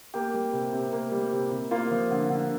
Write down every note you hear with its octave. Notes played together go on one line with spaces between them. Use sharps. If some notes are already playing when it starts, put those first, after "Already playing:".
A#3 G4
G3
C3
C3
A#3
G3
C3
C3
A#3 F4
F3
D3
D3